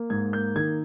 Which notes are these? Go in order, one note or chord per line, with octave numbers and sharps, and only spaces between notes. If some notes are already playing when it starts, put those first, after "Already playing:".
Already playing: A#3
G#2 G#6
A#3 G6
D#3 G#6